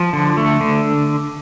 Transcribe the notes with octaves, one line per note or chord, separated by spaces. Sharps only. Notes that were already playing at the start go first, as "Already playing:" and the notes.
Already playing: F3
D3
A3
D3